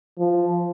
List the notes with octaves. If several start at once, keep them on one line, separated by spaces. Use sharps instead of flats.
F3